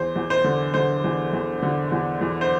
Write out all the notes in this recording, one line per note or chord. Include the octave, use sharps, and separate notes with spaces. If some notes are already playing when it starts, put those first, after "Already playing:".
Already playing: E2 C5
E2
C5
D3
D3 C5
E2
E2
D3
E2
E2
C5